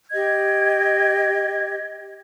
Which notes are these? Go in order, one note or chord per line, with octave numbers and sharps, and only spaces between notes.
G4 D#5 G#6